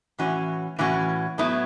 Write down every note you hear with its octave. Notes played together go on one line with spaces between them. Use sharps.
A2 E3 C#4 F#4
A2 E3 C#4 F#4
A2 F#3 B3 E4